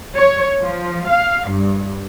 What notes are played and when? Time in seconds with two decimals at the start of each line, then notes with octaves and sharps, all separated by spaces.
0.17 C#5
0.62 F3
1.09 F5
1.51 G2